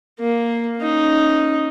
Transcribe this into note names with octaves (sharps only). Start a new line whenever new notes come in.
A#3
C#4 D#4